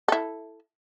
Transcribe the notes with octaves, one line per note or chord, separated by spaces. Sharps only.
E4 A4